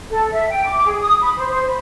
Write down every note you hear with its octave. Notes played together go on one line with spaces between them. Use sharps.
A4
E5
G5
D6
G#4
D#6
B5
C5
C5
B5